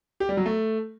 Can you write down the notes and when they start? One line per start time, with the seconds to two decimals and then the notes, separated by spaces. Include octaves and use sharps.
0.20 G4
0.29 G3
0.37 F#3
0.46 A3